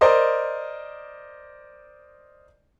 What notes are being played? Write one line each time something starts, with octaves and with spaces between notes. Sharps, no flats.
A#4 C5 D5 D#5 C6